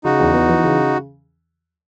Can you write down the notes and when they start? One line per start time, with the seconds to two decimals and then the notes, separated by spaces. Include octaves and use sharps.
0.04 C#3 D#4 F#4
0.19 E2
0.34 B3
0.49 E3
0.64 C#3